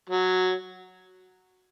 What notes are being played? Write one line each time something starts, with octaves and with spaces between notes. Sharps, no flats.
F#3